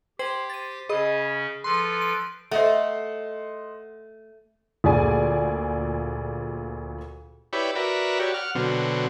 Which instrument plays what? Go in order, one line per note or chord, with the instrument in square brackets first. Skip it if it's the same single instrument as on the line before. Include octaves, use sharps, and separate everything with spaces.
[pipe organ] G4 [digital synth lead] C5 [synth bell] G5 G#6 F#7
[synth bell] A6 D#7
[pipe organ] C#3 C#4 [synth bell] G#4 B5 [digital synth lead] D#5
[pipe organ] F3 A4 B4 [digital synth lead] C6
[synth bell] D7
[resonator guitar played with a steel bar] A3 [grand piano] C5 D#5 F#5
[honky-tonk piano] D2 A#2 G#4 D5 G#5
[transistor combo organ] E4 G4 B4 C#5 D5
F#4 A#4 B4 D5 E5
F#4 G4 C#5 D5
F#5 F6
B2 D3 F#3 C4